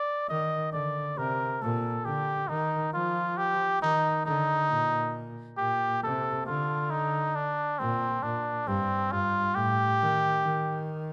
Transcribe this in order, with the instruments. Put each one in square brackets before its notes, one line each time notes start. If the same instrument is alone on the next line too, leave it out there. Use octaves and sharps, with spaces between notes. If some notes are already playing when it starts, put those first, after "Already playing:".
Already playing: [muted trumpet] D5
[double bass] D#3 [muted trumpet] D#5
[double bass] D3 [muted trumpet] D5
[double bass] C3 [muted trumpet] A#4
[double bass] A#2 [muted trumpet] A4
[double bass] D3 [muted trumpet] G4
[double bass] D#3 [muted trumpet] D#4
[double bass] F3 [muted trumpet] F4
[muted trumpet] G4
[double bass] D#3 [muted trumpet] D#4
[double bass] D3 [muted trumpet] D#4
[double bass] A#2
[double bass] A#2 [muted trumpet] G4
[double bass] C3 [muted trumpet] A4
[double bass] D3 [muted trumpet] F4
[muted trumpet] D#4
D4
[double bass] A#2 [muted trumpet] C4
[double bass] A#2 [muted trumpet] D4
[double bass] G2 [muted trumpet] C4
[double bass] G2 [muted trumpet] F4
[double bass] A2 [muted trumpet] G4
[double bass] D#3
D#3